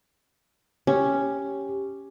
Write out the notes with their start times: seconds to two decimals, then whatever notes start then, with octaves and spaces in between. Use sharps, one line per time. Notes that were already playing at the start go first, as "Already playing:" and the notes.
0.87 C#4 G4